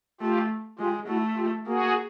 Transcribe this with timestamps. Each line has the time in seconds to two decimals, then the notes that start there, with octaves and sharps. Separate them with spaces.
0.21 A3 F4 G4
0.79 G#3 F4 G4
1.08 A3 E4 F#4
1.37 F4 G4
1.67 A#3 F#4 G#4